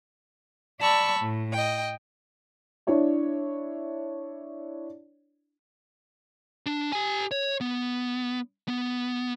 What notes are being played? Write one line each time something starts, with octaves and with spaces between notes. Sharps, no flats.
D5 A5 B5 C#6 E6
A2
D#5 G5
D4 E4 C#5 D5
D4
G4 G#5
C#5
B3
B3